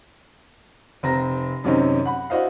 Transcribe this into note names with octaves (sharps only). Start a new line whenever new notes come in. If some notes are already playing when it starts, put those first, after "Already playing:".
F1 C4 A#5 A#6
F#2 C3 D#3 C4 C#4 D#4
F#5 B5
D4 E4 F#4 C5 D#5 F5